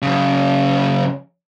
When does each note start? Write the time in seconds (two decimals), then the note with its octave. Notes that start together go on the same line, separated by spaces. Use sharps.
0.02 F#2 C#3